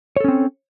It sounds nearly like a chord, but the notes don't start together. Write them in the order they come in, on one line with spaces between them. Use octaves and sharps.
C#5 A4 C#4 C4